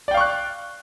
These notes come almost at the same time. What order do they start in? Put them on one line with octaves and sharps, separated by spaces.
D5 G5 F5 C#6 F#6